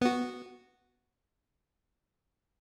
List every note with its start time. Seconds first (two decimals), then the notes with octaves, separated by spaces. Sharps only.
0.01 B3 F#4